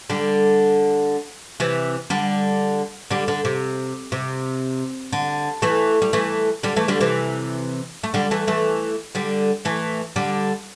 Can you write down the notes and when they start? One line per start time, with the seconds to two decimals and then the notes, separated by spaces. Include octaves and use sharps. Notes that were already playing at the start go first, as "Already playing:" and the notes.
0.10 D3 G3
1.60 C3 E3
2.10 D3 G3
3.11 D3 G3
3.28 D3
3.45 C3
4.12 C3
5.13 D3
5.62 E3 A3
6.02 G3
6.13 E3 A3
6.63 D3 G3
6.76 E3 A3
6.88 D3 G3
7.00 C3 E3
8.04 A3
8.14 D3 G3
8.31 E3 A3
8.48 E3 A3
9.15 D3 G3
9.65 E3 A3
10.16 D3 G3